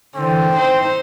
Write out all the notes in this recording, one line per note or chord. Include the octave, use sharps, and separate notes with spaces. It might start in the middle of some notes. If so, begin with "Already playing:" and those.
D3 E3 C4
D#4 C5